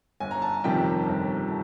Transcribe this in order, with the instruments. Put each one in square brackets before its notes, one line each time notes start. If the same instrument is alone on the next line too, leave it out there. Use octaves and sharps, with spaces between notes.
[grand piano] G1 G#5
A#5
A5
F2 C3 D#3 G3 G5
G1